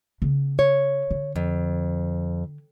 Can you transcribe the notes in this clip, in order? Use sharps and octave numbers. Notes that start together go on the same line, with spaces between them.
C#3 B3
C#5
D3
F2